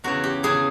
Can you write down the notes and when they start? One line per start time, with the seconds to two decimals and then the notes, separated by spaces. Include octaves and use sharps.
0.04 E2 C#3 E3 F#4
0.24 G4
0.43 E2 C#3 E3 G#4